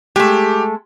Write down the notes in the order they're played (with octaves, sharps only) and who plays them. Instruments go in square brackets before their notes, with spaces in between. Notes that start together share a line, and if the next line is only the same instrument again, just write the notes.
[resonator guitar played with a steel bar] G#3 A3 [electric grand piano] G4